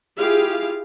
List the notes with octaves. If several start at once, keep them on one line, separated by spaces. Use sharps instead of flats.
E4 F4 G4 G#4 F5